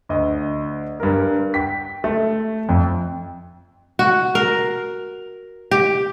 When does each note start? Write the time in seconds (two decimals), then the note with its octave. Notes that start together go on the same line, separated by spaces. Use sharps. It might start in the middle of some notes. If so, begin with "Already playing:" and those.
0.09 D2 D#5
1.00 G2 A#4
1.54 G5 B6
2.04 A3
2.69 F2
3.99 F#4
4.35 A#4
5.71 G4